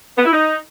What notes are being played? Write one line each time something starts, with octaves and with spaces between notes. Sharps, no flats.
B3
E4
D#4